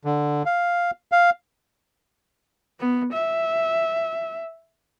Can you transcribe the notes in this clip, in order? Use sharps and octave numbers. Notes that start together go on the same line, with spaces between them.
D3
F5
F5
B3
E5